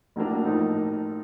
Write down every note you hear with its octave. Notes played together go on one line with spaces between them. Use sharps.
A1 A2 F#3 A#3 D4
A2 F3 A#3 D#4